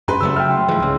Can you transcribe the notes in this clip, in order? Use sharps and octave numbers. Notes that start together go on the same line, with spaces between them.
F#2 B4 C6
C#3 F#3 A3 E6
E5 G5 F6
C6
G#2 E3 F3
C2 C#3